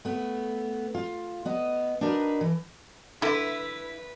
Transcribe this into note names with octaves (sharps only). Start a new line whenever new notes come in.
A3 B3
F4
B3 D#5
D4 D#4 F#4 A#4 B4
E3
D3 E4 B4